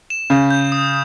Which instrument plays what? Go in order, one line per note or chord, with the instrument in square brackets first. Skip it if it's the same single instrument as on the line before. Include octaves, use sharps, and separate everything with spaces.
[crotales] E7
[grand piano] C#3 [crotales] G6
[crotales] G6
D#6